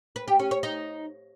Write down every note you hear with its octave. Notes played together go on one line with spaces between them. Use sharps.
B4
G4
C#4
C#5
D#4